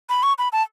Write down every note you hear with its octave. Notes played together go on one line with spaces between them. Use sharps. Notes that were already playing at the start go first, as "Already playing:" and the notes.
B5
C#6
B5
A5